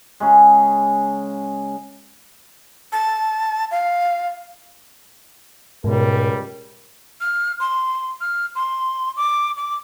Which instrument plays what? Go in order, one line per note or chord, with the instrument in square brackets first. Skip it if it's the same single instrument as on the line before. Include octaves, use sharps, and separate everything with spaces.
[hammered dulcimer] C#3 G#3
[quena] A5
F5
[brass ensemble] C#2 G3 A#4 [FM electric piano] G#2 B2
[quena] F6
C6
F6
C6
D6
D6